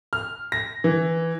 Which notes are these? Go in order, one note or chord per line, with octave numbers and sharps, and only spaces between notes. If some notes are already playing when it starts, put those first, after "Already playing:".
F6
A#6
E3